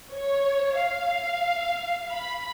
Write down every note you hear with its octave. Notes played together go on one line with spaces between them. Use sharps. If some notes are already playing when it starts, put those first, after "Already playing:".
C#5
F5
B5